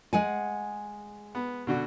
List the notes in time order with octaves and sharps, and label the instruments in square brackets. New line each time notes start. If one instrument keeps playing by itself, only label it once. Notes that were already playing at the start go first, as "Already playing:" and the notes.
[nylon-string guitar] G#3 F#5 G#5
[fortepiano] B3
B2 D3 F#4